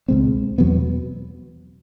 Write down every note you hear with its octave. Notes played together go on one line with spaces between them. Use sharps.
C#2 B2 G#3 C4
E2 B2 F#3 B3